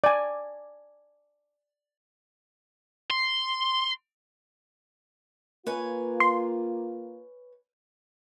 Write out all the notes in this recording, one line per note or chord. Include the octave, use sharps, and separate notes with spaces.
D5 G#5
C6
A#3 F4 B4 C#5 G#5
C6